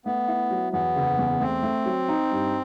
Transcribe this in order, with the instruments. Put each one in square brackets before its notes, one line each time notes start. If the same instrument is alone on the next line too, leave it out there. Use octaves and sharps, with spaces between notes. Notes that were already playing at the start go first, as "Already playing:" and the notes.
[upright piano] A3 [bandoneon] B3
[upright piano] E4
F#3
[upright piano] E2 [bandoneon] B3
[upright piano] F#1
E2
[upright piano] A3 [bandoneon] C4
[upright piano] A3
F#3
D#4
G2